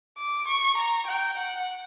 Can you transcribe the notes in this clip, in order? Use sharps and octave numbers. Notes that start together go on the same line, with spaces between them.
D6
C#6
A#5
G5
F#5